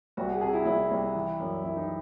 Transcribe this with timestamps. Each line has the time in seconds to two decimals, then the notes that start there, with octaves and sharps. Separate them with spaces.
0.17 C2 F#4
0.29 G#4
0.41 C3 G#4
0.53 E4
0.65 C2 E4
0.91 C2
1.15 E3
1.39 F#2
1.63 F#2 E4
1.77 D#4